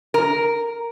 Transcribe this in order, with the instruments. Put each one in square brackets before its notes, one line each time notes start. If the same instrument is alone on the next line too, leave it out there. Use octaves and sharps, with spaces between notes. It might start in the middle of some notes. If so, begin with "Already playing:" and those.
[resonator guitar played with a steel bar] A#4